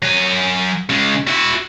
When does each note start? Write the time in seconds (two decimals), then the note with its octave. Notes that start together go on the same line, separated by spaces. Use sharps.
0.02 F#3 G#5
0.90 C#3 G#3
1.27 E4 F#4